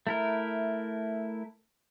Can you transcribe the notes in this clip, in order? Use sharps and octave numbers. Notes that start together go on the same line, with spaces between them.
A3 E4 A#4